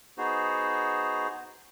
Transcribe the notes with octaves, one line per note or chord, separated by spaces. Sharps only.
B3 D#4 F#4 G#4 C5